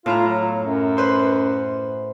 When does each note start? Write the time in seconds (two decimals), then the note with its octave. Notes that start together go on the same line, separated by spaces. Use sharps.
0.06 A2 E4 F4 A#5
0.27 F#3
0.60 F#2
0.97 B4 C5 C6